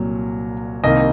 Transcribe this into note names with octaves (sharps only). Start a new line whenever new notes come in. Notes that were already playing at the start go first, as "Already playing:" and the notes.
Already playing: C2 A#2 F#3
C2 C3 D#3 A#3 D#5